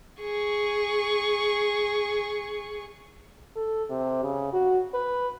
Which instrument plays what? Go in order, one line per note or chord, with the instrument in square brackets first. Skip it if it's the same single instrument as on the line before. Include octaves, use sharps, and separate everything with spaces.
[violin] G#4 C#6
[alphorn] A4
C3
C#3
F#4
B4